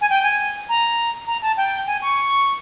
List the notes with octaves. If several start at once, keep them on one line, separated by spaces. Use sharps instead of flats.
G#5
G5
G#5
A#5
A#5
A5
G5
G#5
C#6